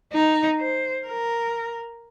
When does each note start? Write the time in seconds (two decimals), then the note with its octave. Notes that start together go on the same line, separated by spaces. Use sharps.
0.12 D#4
0.59 C5
1.07 A#4